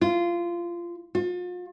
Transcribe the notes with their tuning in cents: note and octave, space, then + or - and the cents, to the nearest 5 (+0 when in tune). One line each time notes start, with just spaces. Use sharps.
F4 -20
F4 +40